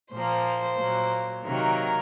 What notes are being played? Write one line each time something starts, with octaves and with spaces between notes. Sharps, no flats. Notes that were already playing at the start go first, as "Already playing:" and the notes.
A#2 F3 A#3 C5
A#2 F#3 A#3
C3 D#3 F#3 A#3 A#4